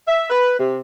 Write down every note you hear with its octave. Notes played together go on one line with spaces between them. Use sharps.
E5
B4
C3